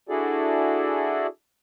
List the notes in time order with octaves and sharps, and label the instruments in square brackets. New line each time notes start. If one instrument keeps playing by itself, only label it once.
[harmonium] D4 E4 F#4 G#4 A4 D5